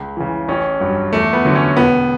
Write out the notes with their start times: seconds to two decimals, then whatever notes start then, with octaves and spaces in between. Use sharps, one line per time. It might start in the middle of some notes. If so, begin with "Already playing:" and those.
Already playing: C#2
0.17 C#3 E3
0.48 A1 C#4
0.80 G2 F#3
1.13 E2 A3
1.33 B3
1.45 D3 F#3
1.55 C#4
1.76 E1 B3